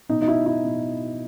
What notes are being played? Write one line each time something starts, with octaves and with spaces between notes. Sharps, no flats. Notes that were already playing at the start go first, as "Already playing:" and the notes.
B2 D#4
D#4
E4
E4
B2